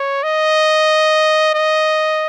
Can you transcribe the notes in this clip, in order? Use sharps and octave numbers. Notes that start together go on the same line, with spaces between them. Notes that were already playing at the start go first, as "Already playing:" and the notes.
Already playing: C#5
D#5
D#5